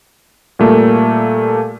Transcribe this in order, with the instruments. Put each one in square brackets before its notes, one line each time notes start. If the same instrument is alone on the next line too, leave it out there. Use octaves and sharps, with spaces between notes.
[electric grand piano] A#2 G3 A3 A#3